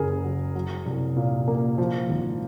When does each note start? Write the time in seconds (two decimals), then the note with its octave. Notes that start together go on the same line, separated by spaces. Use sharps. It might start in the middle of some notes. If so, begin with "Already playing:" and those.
Already playing: F#1 F#2 C#3 G#4 A#4
0.24 F#3
0.55 F#3
0.86 C2
1.16 A#2
1.48 A#3
1.78 F3
2.09 G#1